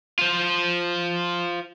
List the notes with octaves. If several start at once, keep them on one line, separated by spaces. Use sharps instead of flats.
F4 C5